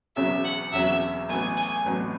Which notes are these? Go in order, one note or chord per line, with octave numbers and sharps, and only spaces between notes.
E1 E2 C#3 F#3 C#4 E5
F#5
E1 E2 C#3 F#3 C#4 E5
A1 A2 F#3 B3 G#5
G#5
A1 A2 F#3 B3